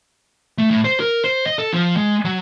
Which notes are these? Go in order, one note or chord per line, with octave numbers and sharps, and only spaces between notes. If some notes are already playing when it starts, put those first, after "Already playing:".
A3
A2
C5
A#4
C5
D#5
A4
F3
G#3
F#3